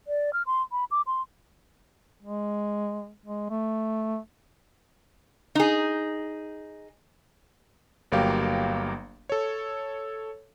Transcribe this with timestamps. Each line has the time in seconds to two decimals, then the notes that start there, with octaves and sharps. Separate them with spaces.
0.07 D5
0.33 F6
0.46 C6
0.72 B5
0.91 D6
1.07 C6
2.22 G#3
3.26 G#3
3.50 A3
5.55 D#4 G#4
8.12 G1 F#3 A#3 G4 F5 G5
9.29 A4 C#5